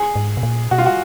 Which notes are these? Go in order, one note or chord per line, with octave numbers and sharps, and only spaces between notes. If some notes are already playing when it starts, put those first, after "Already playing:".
Already playing: G#4
G#2
B2
A#2
B2 F#4
F4
F#4